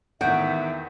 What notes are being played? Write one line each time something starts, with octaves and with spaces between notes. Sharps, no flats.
E2 D#3 F#4 E5 F#5 G5